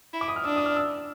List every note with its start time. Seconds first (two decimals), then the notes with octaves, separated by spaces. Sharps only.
0.13 E4
0.21 D6
0.28 D#6
0.36 F6
0.44 D4 E6
0.56 D#6
0.66 F6
0.77 E6